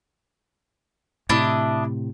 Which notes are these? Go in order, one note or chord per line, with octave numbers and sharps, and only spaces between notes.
A2 C3 D4 E4 D#5